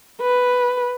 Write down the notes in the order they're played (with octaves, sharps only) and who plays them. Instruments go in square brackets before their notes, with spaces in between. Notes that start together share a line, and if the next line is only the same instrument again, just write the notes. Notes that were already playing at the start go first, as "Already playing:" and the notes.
[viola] B4